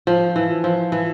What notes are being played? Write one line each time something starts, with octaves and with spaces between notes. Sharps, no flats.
F3
E3
F3
E3